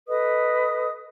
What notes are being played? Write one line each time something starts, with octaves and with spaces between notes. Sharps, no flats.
A4 B4 D#5 D#6